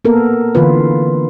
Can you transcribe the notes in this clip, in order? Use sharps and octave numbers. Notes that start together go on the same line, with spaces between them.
A#3 B3 A4 A#4
D3 E3 C4 F4 B4